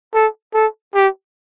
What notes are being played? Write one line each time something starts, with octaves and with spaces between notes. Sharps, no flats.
A4
A4
G4